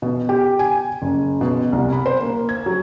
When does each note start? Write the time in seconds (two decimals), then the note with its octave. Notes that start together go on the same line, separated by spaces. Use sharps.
0.02 B2
0.29 G4
0.59 G#5
1.02 F#1
1.41 B2
1.72 C2
1.92 B5
2.06 C5
2.22 A#3
2.49 G#6
2.66 F#3